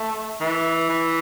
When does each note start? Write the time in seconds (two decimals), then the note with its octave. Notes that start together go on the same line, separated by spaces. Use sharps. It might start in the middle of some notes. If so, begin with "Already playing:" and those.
Already playing: A3
0.41 E3
0.89 E3